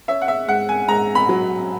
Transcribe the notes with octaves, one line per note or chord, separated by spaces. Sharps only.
C#4 E5
F#5
E5
G#2 F#5
G#5
G#2 A#5
B5
F#3